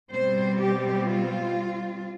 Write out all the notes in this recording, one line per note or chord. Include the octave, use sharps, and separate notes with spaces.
B2 G3 C4 C5
G4
F4